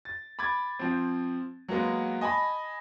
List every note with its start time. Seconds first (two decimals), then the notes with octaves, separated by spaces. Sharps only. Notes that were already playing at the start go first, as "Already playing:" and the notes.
0.05 A6
0.39 B5 D6 G#6 A6
0.79 F3 C4
1.69 F#3 G#3 A#3 B3
2.21 D#5 G#5 A5 B5